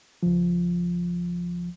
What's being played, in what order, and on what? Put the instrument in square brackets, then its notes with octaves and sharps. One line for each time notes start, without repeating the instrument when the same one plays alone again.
[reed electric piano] C#2 F3